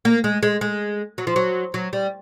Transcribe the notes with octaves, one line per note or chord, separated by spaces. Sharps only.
A#3
G#3
G#3
G#3
F#3
F3
F#3
F#3
G3